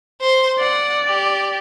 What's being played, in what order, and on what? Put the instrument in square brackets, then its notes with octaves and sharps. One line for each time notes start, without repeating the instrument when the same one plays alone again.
[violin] C5 C6
[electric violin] D5 [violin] F#5
[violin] G4